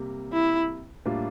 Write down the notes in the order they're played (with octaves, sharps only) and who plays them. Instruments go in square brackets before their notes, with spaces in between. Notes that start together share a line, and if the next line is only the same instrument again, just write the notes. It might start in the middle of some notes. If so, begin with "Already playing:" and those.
Already playing: [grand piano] C3 G3 A#3
[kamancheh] E4
[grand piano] A2 G3 A#3 D4 F4